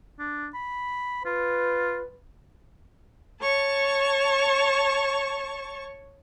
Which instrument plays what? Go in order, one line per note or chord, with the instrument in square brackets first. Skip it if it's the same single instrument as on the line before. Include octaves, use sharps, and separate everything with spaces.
[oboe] D4
B5
[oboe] F4 [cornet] B4
[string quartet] C#5 A5 C#6